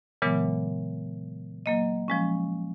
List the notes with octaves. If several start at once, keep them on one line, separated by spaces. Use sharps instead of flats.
A#2 C#3 E3 F#3 G#3 B3
F#3 A#3 D#5
F3 G#3 C#4